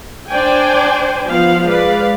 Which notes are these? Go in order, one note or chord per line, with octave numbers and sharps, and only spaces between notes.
D4 C5 D5 G5 G#5
F3 B3 F5
G#3 B4 D5 F5